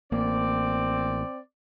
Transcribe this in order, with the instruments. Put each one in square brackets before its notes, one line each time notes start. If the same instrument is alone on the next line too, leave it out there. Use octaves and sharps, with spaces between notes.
[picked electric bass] A1 A#3 [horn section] C4 D5